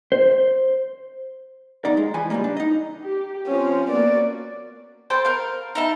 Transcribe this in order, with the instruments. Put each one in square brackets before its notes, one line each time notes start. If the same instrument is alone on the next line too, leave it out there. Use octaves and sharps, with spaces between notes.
[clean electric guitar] C5
[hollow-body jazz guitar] F2 B2 D#4 D5
G#3
E3 F3 G#5 B5
C#2 G2 B2 G3 A#3
D4
D#4 D#5
[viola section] G4
[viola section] F3 C4 [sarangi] C#4
[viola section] A#3 B3 F#4 [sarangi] D5
[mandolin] A4 C5 G5
A#4 F5
D#4 E5 A5